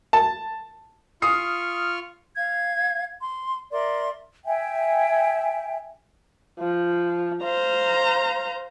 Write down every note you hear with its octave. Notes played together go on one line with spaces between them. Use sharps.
A5
F4 C#6 D#6 F6 C7
F5 G#6
C6
A#4 D5 E5 C6
E5 G5 G#5
F3
C5 F5 A#5